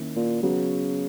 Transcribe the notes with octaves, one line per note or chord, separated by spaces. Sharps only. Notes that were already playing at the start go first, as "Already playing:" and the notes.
Already playing: D#3 A#3 C#4 E4 A#4
A#2
C#3 F#3 B3 F#4 B4